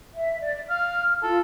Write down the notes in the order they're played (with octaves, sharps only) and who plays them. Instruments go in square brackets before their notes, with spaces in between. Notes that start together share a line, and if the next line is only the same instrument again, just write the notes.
[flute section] E5
D5
[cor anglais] F5 [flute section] F6
[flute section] F4 [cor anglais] A4